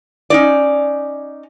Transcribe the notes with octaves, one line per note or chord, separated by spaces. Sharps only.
C#4 D#4 D5